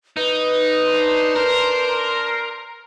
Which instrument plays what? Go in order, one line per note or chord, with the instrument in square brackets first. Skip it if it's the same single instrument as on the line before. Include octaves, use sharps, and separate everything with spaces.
[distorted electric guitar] D#4 [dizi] B4
[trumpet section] D4 C5 C6
[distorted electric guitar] A#4